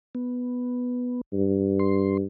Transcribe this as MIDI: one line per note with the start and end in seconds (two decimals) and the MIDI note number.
0.15 1.21 59
1.33 2.26 43
1.79 2.17 84